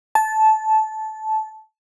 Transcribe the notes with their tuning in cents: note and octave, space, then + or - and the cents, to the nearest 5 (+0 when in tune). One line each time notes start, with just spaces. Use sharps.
A5 -15